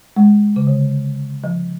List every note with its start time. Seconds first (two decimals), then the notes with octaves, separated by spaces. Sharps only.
0.16 G#3
0.56 C#3
0.67 D3
1.44 F3